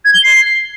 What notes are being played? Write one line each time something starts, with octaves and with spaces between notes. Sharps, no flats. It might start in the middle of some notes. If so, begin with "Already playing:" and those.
G#6
G7
C7